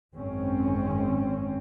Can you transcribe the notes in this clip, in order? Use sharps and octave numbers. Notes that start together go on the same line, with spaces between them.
G#1 F#2 C4 C#4